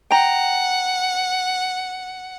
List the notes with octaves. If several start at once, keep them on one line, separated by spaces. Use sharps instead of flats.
F#5 G5 A#5